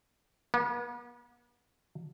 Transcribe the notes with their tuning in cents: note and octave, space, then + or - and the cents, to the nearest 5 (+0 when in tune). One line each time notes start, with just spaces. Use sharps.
B3 -40